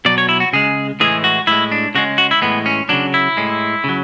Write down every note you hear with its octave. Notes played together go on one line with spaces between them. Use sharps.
B2 F#3 D5
C#5
E4
F#4
C#3 G#3 G#4
A2 E3 G#3 G#4
F#4
A2 G#3 E4
D4
C#3 G#3 F#4
F#4
E4
A2 E3 G#3 B3
C#4
C#3 F#3 D4
E4
A2 G#3
C#3 F#3